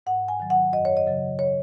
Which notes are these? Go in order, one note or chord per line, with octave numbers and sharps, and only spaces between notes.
G#2 F#5
G#5
D#3 F#3
F#5
F#2 D#5
C#5
D#5
C#3 F#3
C#5